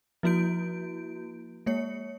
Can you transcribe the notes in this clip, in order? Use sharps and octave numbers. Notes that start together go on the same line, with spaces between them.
F3 A#3 E4 F#4 G6 D7
G#3 A#3 C#5 C#7